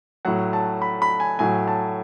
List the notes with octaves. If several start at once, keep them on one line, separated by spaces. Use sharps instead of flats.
A2 F#3 F#5
A5
B5
B5
G#5
A2 F#3 G#5
A5